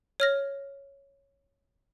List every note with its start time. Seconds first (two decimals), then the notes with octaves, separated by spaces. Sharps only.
0.20 C#5 F6 A#6